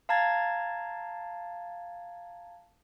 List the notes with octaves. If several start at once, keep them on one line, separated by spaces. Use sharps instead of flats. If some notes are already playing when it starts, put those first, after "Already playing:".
F5 A5 A#5 G#6 A6